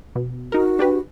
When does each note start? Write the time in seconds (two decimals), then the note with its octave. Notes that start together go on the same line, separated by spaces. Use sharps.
0.15 B2
0.52 D#4 F#4 A#4
0.79 D4 G4 B4